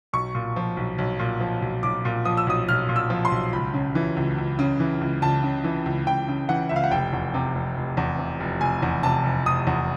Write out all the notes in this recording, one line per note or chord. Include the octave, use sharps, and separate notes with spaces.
B1 C#6
A#2
F3
B1
B1
A#2
F3
B1
B1 D6
A#2
F3 D#6
E6
B1 D#6
B1 F6
A#2
E6
F3
C6
B1
C#2 B5
C#3
E3
C#2
C#2
C#3
E3
C#2
C#2 A5
C#3
E3
C#2
C#2 G5
C#3
E3 F#5
C#2 E5
F5
F#5
F1 G5
E2
C3
F1
F1
E2
C3
F1
F1 G#5
E2
C3 A5
F1
F1 D#6
E2